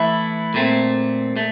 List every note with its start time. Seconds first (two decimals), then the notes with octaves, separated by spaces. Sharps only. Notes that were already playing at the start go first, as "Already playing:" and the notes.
Already playing: E3 A3 E4
0.54 A#2 A3 C4
1.36 A#2 A3